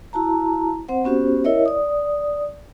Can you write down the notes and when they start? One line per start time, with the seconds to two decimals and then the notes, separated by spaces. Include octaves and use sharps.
0.13 E4 F#4 A5 A#5
0.89 C4 C5 F#5
1.04 B3 C#4 F#4 G4 C5
1.44 E4 A#4 C#5 D#5 E5
1.66 D5 D#6